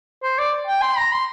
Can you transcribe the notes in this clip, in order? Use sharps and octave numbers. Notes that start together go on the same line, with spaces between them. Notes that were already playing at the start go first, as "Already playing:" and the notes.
C5
D5
G5
C6
A#5
C6